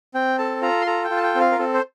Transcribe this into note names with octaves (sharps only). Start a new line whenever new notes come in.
C4 G5
A4 A5
F4 A#5
C6
A4 A#5
G5
F4
A5
G5
C4
F5
A#4
C4 A4
C5